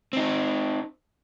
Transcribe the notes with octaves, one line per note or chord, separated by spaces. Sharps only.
C4 D#4